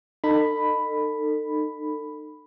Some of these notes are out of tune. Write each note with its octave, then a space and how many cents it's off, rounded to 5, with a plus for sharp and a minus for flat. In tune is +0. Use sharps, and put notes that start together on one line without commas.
D#4 -30 A4 +30 B5 +0